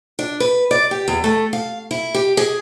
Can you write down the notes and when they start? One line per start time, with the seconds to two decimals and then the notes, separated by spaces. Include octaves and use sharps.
0.19 D4
0.40 B4
0.71 D5
0.91 G4
1.08 E2
1.24 A3
1.53 F5
1.91 E4
2.14 G4
2.37 G#4